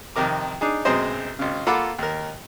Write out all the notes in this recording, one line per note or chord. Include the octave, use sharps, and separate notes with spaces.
F2 C3 D#3 A#4 D6
D4 D#4 G#4
B1 F#2 G#3 C4 C5 D#5
G#1 C#3
A#3 F4 A4 F#5 B5 D6
D#2 A#4